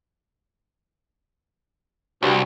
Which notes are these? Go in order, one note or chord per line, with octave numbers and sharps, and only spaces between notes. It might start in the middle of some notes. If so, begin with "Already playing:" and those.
C2 G2 F#3